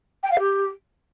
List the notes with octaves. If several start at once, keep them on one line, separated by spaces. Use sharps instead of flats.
G5
F5
G4